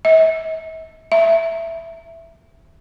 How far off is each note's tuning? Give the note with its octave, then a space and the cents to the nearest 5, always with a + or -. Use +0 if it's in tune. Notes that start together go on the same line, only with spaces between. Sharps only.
E5 -40
E5 +10